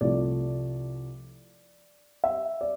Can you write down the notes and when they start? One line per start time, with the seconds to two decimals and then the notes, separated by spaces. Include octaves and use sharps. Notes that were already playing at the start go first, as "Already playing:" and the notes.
0.01 C2 C3 F3 A3 D5
2.24 E5
2.61 D5